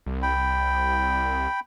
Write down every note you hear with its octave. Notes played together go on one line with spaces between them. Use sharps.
C2
G5 B5